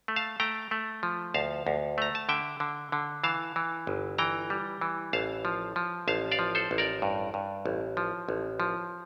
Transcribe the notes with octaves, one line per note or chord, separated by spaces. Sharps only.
A3
F5 A5
A3 G5 A#5
A3
F3
D2 F5 A5
D2
A3 A#5
A5
D3 E5 G5
D3
D3
E3 F5 A5
E3
G1
E3 G5 A#5
G3
E3
A1 F5 A5
F3
F3
A1 F5 A5
D5 F5
F3
A4 C5
A1
A#4 D5
G2
G2
A1
F3
A1
F3